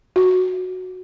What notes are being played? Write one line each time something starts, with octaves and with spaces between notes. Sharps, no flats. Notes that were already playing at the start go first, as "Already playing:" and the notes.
F#4